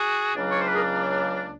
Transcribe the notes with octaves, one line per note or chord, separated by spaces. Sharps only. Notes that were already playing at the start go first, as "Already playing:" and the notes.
Already playing: F#4 G#4
C#2 C#3 F#3 A#3 D4
C#5
C5
B4
G#4 A#4